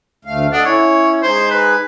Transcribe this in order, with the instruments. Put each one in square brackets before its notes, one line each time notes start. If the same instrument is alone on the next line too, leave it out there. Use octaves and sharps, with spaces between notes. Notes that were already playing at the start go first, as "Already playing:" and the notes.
[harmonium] D2 A3 F5
[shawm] D4 [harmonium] A4 D#5 F#5
[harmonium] C#4 E4 [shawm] C#5
[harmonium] G#3 D#4 G#5 [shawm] C5
[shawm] B4